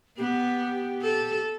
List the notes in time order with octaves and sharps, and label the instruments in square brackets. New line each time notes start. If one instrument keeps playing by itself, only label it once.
[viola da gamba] B3 [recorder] G4
[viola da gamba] A4